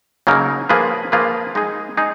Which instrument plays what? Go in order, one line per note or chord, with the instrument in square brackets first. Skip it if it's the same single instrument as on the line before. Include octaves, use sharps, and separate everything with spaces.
[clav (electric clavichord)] C#3 F#3 A#3 D#4 A#4
F3 A#3 F4 G#4 B4
F3 A#3 F4 G#4 B4
G#3 D#4 G#4
G#3 D#4 G#4